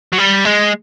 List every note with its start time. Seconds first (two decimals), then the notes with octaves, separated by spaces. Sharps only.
0.13 F#3
0.18 G3
0.45 G#3